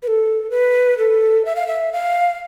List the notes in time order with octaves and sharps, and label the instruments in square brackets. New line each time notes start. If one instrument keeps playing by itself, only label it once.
[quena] B4
A4
B4
A4
E5
F5
E5
F5